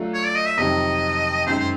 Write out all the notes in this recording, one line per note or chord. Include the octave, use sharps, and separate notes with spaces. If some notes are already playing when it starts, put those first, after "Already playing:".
Already playing: F#3 A3 D4 F4 A4
C#5
D5
D#5
E5
F2 C3 D#3 F#3 D#5
F#2 D#3 G#3 C5
C5